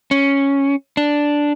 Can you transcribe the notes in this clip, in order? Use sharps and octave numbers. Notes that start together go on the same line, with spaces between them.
C#4
D4